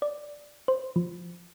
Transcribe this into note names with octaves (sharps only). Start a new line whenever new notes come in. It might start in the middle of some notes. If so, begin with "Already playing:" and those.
D5
C5
F3